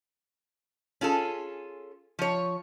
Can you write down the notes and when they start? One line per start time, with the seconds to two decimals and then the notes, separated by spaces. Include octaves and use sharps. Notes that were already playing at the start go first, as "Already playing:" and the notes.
1.01 C#4 F4 G#4 A4
2.19 F3 C#5